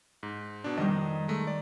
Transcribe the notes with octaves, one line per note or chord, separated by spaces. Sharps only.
G#2
B2 D4
F2 D#3 G3 D#5
G#3 A3
D5